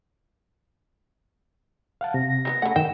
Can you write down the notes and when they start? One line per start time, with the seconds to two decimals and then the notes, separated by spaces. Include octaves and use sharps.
2.01 F5 F#5 A5
2.14 C3 A#6
2.28 A#6
2.45 D#3 G#3 B3
2.62 C#3 A3 F#5 G#5
2.76 F#2 D#3 G5 E7